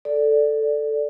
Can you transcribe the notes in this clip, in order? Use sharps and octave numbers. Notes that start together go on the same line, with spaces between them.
A4 D5